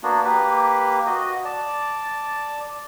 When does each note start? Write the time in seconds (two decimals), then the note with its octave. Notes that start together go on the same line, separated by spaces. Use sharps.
0.03 A#3 B3 D4 F#4
0.25 A#3 G4 B4
1.07 F#4 D#5
1.45 D5 A5